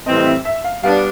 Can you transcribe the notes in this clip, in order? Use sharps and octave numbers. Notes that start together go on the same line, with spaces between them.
A2 E3 G3 C4 D#5
D#5
E5
E5
F5
G3 B3 D4 F5